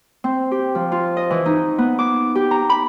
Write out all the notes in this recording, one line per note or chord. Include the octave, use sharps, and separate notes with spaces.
C4
G4
F3
F4
D#5
E3
D#4
B3
D6
G4
A#5
B5